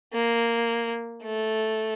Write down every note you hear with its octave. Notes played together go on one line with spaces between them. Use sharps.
A#3
A3